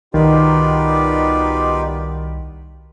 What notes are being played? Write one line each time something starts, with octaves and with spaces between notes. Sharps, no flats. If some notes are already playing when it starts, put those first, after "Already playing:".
C2 B2 D#3 D#4 F4 G4 B4 D5